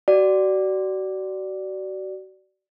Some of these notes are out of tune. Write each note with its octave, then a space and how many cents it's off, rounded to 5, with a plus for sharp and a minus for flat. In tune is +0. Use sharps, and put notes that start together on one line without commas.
F#4 +35 D5 +0